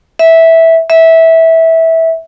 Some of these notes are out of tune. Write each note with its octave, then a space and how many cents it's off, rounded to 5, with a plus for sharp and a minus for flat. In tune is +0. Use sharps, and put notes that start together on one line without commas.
E5 -10
E5 -15